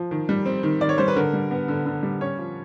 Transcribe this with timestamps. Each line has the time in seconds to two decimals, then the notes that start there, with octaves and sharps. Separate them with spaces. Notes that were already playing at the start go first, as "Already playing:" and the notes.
Already playing: F3
0.11 D#3
0.29 G3
0.46 C4
0.63 D#3
0.81 D#3 D5
0.89 C#5
0.98 G3 C5
1.08 B4
1.16 D3 A#4
1.33 G3
1.51 B3
1.68 D3
1.86 D3
2.03 G3
2.21 C#4 C#5
2.38 F3